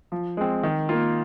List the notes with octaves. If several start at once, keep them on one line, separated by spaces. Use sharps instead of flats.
F3
G#3 C4
D#3
A#3 F4